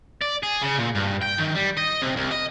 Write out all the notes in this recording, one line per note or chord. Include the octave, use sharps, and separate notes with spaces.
D5
G#4
C#3
A#2
G2
G5
D#3
G3
D#5
C3
C2
D#5